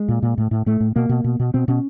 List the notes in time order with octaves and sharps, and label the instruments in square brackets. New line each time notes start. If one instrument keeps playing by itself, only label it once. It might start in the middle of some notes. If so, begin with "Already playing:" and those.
Already playing: [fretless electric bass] G#3
A#2
A#2
A2
A2
A2 A3
A2
B2 A#3
B2
B2
B2
B2 C4
B2 C#4